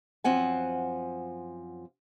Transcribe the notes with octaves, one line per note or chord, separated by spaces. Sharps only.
F#2 F3 C4 F#5 G#5